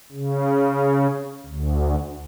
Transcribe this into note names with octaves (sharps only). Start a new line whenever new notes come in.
C#3
D2